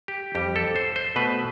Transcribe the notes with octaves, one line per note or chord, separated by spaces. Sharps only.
G4
F2 E3 G3 G4
A4
C5
C5
B2 A3 B4